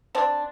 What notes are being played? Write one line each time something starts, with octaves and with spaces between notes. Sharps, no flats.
C4 D4